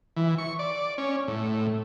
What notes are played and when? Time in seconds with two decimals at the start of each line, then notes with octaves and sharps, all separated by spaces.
0.16 E3
0.38 C#6
0.59 D5
0.98 C#4
1.28 A2